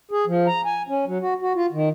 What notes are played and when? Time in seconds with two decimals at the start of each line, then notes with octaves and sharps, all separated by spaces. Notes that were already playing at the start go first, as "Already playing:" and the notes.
0.11 G#4
0.27 F3
0.47 A#5
0.65 G#5
0.89 C#4
1.07 F#3
1.22 F#4
1.41 F#4
1.56 F4
1.72 D#3